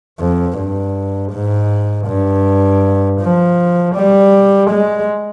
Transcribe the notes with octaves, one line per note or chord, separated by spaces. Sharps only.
F2
G2
G#2
G2
F3
G3
G#3